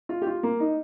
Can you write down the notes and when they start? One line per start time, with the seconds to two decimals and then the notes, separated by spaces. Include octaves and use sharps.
0.09 F4
0.22 G4
0.27 F4
0.43 A#3
0.60 D#4